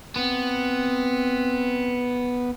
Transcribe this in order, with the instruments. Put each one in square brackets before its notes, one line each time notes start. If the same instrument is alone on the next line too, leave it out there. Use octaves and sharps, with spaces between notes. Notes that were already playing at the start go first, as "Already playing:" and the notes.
[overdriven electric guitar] B3 [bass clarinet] C4